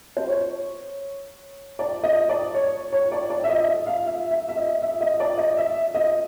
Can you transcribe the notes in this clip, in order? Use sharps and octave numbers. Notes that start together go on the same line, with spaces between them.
C5
C#5
D5
D#5
D5
C#5
C#5
D5
D5
E5
D#5
E5
F5
E5
E5
E5
D#5
E5
D#5
D5
D#5
E5
D#5